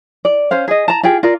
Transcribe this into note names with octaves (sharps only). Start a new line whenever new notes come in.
D5
C#4 C5 F5
G#4 D#5
A5 A#5
F4 G4 G#4 G5
F4 A#4 D5